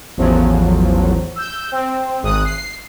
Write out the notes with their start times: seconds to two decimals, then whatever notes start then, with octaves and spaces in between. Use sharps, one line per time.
0.17 A1 E2 F3 F#3
1.36 E6 G6
1.72 C4
2.23 G#1 D#6 F#6
2.45 C7